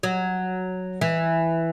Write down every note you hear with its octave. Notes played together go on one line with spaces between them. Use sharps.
F#3
E3